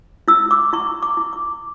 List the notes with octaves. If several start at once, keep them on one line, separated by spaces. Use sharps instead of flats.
E4 E6
D6
E4 C#6
D6
E4
D6